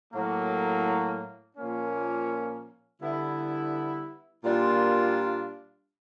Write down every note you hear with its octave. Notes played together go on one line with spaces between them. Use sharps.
A2 F#3 A#3
A#2 F3 A#3 C#4
D3 G3 B3 E4
A#2 G3 A#3 D4 F4